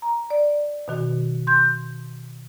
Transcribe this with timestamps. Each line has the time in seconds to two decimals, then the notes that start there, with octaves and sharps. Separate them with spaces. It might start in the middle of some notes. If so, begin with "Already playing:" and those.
0.02 A#5
0.30 D5
0.88 B2 D#3 F#4
1.47 C6 G6